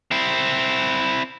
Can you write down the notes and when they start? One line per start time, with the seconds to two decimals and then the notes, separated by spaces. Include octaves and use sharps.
0.11 C4 E4